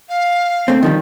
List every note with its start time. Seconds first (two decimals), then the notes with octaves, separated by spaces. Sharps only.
0.09 F5
0.68 A3 C4
0.83 D#3 F3 G3